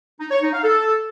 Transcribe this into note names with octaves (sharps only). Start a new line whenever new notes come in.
D#4
C#5
D#4
F5
A4